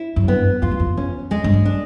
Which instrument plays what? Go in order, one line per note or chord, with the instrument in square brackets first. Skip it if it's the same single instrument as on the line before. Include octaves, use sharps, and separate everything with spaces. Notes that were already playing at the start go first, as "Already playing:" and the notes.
Already playing: [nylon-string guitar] E4
[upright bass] F#2
[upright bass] G2 [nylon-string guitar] B3
[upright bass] F2 [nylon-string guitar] F4
[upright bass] E2
F2
[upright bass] E2 [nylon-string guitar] C#4
[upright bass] F2 [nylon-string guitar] G#3
[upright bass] G2
F#2
[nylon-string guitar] D4